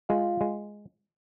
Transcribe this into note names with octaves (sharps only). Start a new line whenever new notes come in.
G#3 F4 F5
G#3